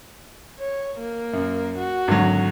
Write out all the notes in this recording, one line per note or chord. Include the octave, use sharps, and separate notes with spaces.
C#5
A#3
F#2
F#4
G#1 D3 F#3